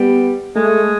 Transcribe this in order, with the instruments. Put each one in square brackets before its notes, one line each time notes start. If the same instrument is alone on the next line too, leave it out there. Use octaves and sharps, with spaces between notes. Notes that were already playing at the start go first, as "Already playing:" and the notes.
Already playing: [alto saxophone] G3 [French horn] B3
[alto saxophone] G#3 [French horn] A3